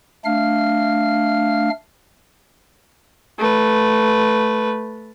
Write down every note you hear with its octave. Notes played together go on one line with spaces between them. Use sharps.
A3 D4 F5 F6
A3 B4